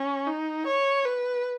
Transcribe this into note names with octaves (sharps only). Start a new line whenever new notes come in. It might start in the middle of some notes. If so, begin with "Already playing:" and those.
Already playing: C#4
D#4
C#5
B4